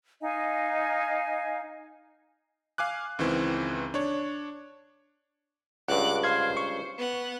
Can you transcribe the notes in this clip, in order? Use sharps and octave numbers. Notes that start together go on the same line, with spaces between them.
D#4 D#5 F5 G#5
F5 G#5 D6 F#6
C#2 D#3 E3 C4
D4 C#5
C#2 G2 F#5 D6 F#6
C5 F5 C6 G#6
C#6
B3 F#5